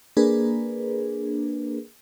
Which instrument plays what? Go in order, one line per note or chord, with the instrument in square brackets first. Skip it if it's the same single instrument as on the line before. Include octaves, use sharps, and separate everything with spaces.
[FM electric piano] A#3 D4 G#4 A#4 B4